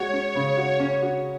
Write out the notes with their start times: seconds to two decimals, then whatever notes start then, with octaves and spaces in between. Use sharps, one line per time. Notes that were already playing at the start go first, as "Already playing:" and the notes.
Already playing: G#3 F#4 C#5
0.13 C#4
0.35 C#3
0.57 F#4
0.80 C#4
1.02 F#4